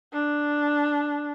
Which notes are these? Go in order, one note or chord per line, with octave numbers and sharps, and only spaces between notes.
D4